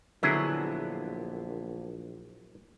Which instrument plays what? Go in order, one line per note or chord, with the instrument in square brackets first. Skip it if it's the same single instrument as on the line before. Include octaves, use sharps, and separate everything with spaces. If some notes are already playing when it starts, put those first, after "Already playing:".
[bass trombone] A#1 [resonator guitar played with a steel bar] D3 B3 E5 [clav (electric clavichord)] F#3 E4 G#4